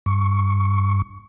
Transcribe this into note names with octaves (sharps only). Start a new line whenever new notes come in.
G2 C#6